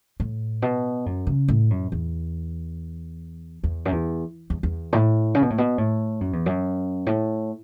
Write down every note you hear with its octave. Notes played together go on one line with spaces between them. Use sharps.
A2
B2
F#2
C#3
A2
F#2
E2
E2
F#2
E2
E2
E2
A2
C#3
B2
A2
B2
A2
F#2
E2
F#2
A2